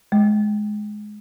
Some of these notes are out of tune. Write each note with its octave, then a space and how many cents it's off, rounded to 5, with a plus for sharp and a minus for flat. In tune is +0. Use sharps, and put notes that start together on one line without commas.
G#3 +15